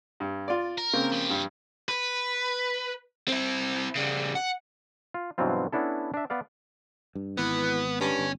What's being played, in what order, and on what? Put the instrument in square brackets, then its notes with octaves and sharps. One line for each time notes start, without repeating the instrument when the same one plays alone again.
[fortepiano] G2
F4 D5
[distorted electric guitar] A#4
[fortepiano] C#3 A#3 C4
[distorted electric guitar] F3 G4
[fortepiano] G2
[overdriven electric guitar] B4
C4 E4
C#3 G3
F#5
[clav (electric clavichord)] F4
G2 B2 E3 F#3 C4 F4
B3 C#4 D4 E4 A4
D4 E5
B3 D5 F5
[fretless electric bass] G2
[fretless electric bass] G#1 [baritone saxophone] E3 [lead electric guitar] B3
[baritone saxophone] G2 [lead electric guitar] C#4
[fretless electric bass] G1